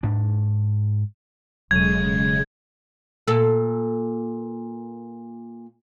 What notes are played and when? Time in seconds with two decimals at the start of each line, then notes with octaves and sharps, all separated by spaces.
0.03 G#2 D4
1.71 E1 C#3 F#3 G#3 A4 G#6 D#7
3.28 A#2 A4